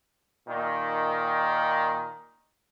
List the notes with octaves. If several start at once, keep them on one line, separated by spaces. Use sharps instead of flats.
A#2 D#3